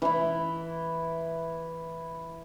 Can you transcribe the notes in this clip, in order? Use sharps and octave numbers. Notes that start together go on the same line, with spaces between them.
E3 E4